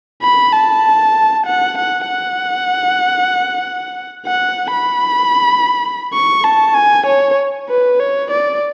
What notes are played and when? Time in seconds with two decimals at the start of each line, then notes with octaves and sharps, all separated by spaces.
0.22 B5
0.53 A5
1.46 F#5
1.78 F#5
2.08 F#5
4.26 F#5
4.73 B5
6.13 C#6
6.44 A5
6.75 G#5
7.06 C#5
7.69 B4
8.00 C#5
8.30 D5